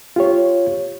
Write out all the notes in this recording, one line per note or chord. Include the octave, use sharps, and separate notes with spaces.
F4 G4 C#5